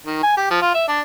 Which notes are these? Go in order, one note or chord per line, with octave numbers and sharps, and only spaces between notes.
D#3
G#5
G4
F3
F4
E5
D4